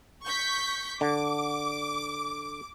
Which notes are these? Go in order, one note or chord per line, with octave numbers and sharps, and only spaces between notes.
C#6 G6 B6
D3 D6